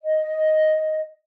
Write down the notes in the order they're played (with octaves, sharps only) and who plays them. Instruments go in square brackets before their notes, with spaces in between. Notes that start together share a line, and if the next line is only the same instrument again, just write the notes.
[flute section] D#5